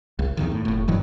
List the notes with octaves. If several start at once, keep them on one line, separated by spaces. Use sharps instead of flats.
C2
E2 B2 D#3
A2
F1 A2
G2 D#3 E3 F#3